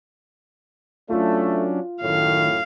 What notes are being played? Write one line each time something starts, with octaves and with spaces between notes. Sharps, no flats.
F#3 A3 C#4 D4 F4
F#2 A2 D#3 F5